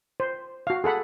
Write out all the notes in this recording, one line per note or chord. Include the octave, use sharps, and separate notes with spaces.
C5
F#4 F5
G#4 A4 F#5 B5